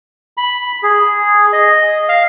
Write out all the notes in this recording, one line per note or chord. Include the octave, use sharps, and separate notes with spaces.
B5
G#4
D#5
F5